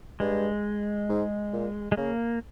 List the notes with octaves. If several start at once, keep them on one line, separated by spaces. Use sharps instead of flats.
G2 G#3
G#2
A#2
G#3
C#3 A#3